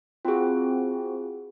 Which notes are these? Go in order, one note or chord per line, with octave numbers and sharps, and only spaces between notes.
C4 F4 F#4 G#4